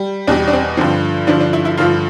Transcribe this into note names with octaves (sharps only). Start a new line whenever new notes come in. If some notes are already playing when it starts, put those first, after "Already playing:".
Already playing: G3
E2 B2 G3 D4
D4
C4
G2 D3 F3 C4
G2 D3 F3 D4
D4
E4
E4
G2 D3 F3 F4